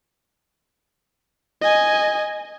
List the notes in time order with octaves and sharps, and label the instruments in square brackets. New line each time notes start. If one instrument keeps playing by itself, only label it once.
[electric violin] D#5 G#5